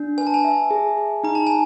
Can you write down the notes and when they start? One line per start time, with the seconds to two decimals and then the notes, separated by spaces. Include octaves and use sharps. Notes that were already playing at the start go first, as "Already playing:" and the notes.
Already playing: D4
0.18 B4 G#5
0.27 A5
0.34 G#5
0.44 E5
0.71 G#4
0.98 G#4
1.24 D#4 A#5
1.35 A5
1.47 G#5